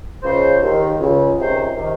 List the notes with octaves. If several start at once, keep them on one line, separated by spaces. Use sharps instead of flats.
C#2 C#3 C5
D#2 D#3
C#2 C#3
C#2 C3 D#3 C5
C3 D#3